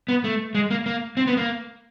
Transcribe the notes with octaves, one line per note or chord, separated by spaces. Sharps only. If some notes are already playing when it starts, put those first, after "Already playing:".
B3
A3
G#3
A#3
A#3
C4
B3
A#3